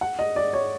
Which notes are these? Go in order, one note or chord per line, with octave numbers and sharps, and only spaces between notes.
F#5
D#5
D5
C#5